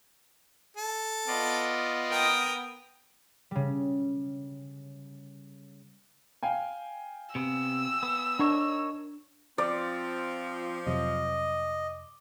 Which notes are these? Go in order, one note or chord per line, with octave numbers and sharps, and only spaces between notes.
A4
B3 F4 D5 D#5
A#4 G5 D#6
C#3 G3
F5 G5 G#5
C3 B3 E6
B3
D4 D#4 A#4 C#5
F3 C4 D5
F2 C3 F#3 D#5